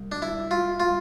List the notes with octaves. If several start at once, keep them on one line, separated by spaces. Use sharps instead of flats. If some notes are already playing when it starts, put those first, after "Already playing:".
Already playing: C2
D4
E4
F4
F4